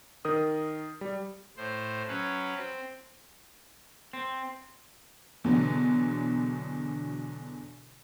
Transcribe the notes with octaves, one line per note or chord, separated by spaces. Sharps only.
D#3 A#4 D#6
G3
A2 C5
F#3 C#4 B4
C4
C4
E2 B2 D3 F#3